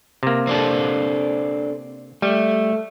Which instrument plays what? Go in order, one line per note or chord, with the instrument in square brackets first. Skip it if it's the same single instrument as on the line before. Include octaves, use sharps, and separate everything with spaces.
[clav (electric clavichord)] C3 A#3
[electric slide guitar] C4 D4 A4
[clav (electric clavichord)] G3 [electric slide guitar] A3